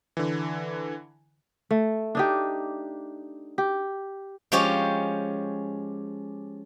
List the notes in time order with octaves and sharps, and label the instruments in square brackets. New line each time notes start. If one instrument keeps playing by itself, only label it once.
[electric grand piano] D3 E3
[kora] A3
D4 D#4 G4
G4
[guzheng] F3 G#3 C#4 G4 C#5